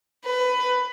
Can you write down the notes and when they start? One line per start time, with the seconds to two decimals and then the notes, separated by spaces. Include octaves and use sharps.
0.25 B4